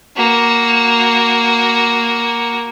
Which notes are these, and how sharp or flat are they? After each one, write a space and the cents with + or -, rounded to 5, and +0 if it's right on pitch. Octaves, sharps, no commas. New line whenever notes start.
A#3 +0 F#4 +0